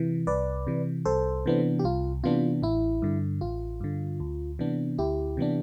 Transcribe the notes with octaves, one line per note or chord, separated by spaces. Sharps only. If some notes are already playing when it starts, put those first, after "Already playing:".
Already playing: C3 E3
C2 B4 D5
C3 E3
C2 A4 C5
C3 E3 B3 D4
G4
C2 F4
C3 E3 B3 D4 F4
A1 E4
G2 D3
A1 F4
G2 D3
D2
C3 E3 B3 D4
D2 E4 G4
C3 E3 B3 D4